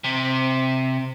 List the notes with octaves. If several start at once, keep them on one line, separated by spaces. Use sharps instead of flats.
C3